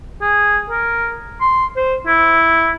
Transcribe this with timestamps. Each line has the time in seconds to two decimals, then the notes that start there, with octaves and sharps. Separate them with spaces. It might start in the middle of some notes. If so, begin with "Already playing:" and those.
0.22 G#4
0.70 A#4
1.41 C6
1.76 C5
2.07 E4